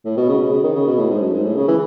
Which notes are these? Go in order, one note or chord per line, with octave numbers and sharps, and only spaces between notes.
A2
B2
C#3
B2
C#3
D#3
C#3
B2
A2
G#2
F#2
G#2
A2
C#3
E3